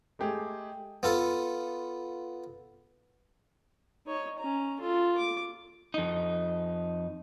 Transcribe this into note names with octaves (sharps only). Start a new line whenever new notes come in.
G#3 A3 G4 G#4
B3 F4 A4
D#4 C#5
C#4 A#5
F4 A4
D6
F2 D#4